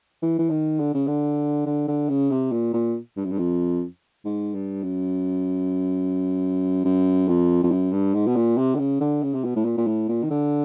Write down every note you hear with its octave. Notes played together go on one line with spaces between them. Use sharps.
E3
E3
D#3
D3
C#3
D3
D3
D3
C#3
C3
A#2
A#2
G2
F#2
G2
F2
G#2
G2
F#2
F#2
F2
F2
F#2
G2
G#2
B2
A#2
C3
D3
C#3
D3
C#3
C3
B2
A2
A#2
A#2
A2
A#2
D#3
D3